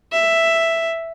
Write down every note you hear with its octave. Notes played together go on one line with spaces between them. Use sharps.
E5